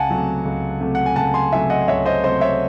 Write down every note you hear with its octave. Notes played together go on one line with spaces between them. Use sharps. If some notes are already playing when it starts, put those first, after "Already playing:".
Already playing: C#2 F#5 G#5 A5
C3 F#3 A3
C#2
C3 F#3 A3
F#5
G#5
C#2 F#5 A5
G#5 C6
C3 F#3 A3 E5 G#5
D#5 F#5
C#2 C#5 E5
C5 D#5
C3 F#3 A3 C5 D#5
C#5 E5